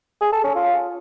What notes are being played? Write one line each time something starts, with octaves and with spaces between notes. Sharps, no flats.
G#4
A4
C#4
F4